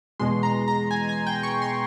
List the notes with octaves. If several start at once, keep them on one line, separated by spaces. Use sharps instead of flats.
E2 B2 G#3 C6
A#5
A#5
G#5
G#5
G5
C#6
C6